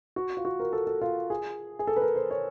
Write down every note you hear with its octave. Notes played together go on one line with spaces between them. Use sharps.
F#4
F4
F#4
A#4
A4
A4
F4
G#4
G#4
A4
B4
A#4
C5
C#5